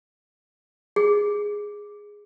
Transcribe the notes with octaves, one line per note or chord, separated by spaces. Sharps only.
G#4